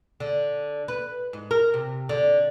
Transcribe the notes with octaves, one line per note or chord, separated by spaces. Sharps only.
D3
B4
G#2
A#4
C3
D3